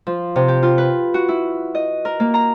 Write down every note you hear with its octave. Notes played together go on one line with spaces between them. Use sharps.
F3
C3
G4
F4
B4
F#4
E4
D#5
A#4
A#3
A#5